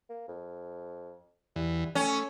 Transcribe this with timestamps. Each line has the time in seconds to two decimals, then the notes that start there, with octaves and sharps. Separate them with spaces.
0.10 A#3
0.28 F2
1.56 E2 E3 G3
1.95 A3 C#4 A4